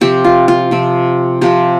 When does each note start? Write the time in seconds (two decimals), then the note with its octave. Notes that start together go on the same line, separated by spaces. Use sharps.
0.01 C3 F3 C4 G4
0.24 F4
0.48 F4
0.71 C3 F3 C4
1.41 C3 F3 C4 G4